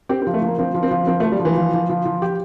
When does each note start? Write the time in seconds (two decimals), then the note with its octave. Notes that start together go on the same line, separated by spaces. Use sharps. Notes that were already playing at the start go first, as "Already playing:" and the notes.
0.09 C4 G4
0.22 C4
0.27 F3
0.34 A3
0.42 F3 A#3
0.58 F3 C4
0.74 F3
0.83 C4
0.91 F3
1.07 F3 C4
1.20 A3
1.23 F3
1.32 G3
1.40 F3
1.45 E3
1.56 F3
1.74 F3
1.89 F3
2.05 F3
2.22 G4